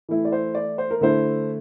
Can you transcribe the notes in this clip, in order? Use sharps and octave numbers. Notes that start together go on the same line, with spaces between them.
E3 A3 E4
D5
C5
D5
C5
A#4
D3 A3 E4 C5